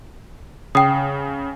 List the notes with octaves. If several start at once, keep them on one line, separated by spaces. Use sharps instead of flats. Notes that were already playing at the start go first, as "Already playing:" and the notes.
C#3 G5 D#6